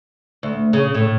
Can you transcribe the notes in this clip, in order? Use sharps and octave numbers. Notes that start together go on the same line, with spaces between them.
D2
C#3
A2